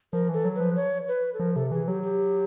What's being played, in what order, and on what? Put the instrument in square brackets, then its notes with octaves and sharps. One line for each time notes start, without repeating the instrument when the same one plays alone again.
[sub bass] F3 [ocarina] A#4
[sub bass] E3 [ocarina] A4
[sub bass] F#3
[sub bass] F3 [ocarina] B4
[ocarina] C#5
B4
A4
[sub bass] F3 [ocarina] A#4
[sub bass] C3 [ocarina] A4
[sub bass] E3 [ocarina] G#4
[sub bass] F#3 [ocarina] G4
[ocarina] G4